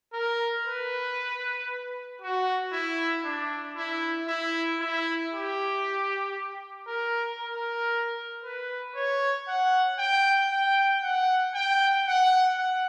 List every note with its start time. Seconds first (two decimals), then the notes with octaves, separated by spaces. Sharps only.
0.13 A#4
0.65 B4
2.21 F#4
2.72 E4
3.24 D4
3.77 E4
4.28 E4
4.81 E4
5.32 G4
6.87 A#4
7.39 A#4
8.44 B4
8.95 C#5
9.48 F#5
9.99 G5
10.51 G5
11.02 F#5
11.55 G5
12.07 F#5
12.58 F#5